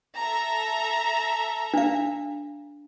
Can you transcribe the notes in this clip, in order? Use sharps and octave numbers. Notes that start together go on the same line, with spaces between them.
A4 E5 A#5
D4 F5